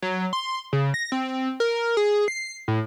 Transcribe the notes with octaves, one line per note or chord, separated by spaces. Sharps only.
F#3
C6
C#3
A#6
C4
A#4
G#4
C7
A2